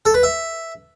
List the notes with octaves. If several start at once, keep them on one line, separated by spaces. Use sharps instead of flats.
A4
B4
E5